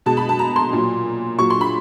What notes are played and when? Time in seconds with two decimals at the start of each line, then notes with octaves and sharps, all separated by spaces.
0.06 B2 G#3 A5
0.17 B5
0.29 A5
0.39 A#5
0.56 C6
0.73 A#2 F#3
1.38 A#2 F#3 C#6
1.50 C6
1.61 B5